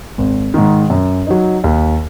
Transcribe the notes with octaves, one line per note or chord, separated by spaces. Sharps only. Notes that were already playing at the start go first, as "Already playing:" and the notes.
G#1
G#2 D#3
F#2
F#3 D#4
D#2